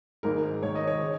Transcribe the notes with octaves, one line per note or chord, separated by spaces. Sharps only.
G#1 G#2 G#3 A#4
G#1 G#2 D#3 C#5
D#5
C#5
C#3